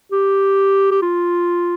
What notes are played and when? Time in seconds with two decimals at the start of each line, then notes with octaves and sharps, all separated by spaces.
0.12 G4
0.91 G4
1.02 F4